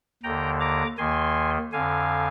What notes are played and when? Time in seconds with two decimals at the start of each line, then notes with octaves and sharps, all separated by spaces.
0.23 D#2 D3 G5 A#5
0.60 A#5 D6
0.97 D#2 D#3 G#5 C6
1.72 F2 D3 F5 G#5